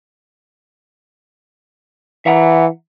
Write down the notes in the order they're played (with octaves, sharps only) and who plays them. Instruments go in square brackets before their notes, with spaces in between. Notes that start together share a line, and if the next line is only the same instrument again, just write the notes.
[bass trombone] E3 [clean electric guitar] E5 F#5 A#5